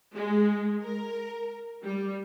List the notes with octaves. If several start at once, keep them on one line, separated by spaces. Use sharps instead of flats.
G#3
A#4
G3